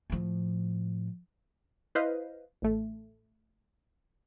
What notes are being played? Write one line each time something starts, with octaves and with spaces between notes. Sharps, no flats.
A2 F3
E4 B4 C5 D#5 F5
A1 A3